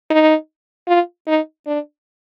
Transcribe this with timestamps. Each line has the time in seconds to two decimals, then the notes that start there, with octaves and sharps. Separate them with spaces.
0.11 D#4
0.88 F4
1.27 D#4
1.67 D4